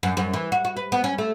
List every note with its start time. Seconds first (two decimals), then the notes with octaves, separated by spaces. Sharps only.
0.03 F#2
0.17 F#2
0.33 E3
0.52 F#4
0.65 F#4
0.77 B4
0.92 B3
1.04 C#4
1.18 A3